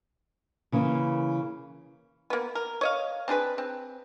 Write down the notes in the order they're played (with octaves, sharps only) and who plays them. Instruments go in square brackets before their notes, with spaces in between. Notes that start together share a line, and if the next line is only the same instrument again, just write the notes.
[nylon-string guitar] C#3 E3 A#3
[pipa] A#3 B3
A#4
C#5 D#5 F5
C4 D4 G#4 B4
C4